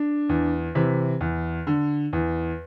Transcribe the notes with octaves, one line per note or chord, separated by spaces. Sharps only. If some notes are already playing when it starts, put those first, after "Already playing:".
Already playing: D4
E2
C3 E3
E2
D3
E2